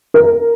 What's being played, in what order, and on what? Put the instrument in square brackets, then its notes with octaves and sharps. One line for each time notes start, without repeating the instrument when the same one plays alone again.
[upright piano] A#4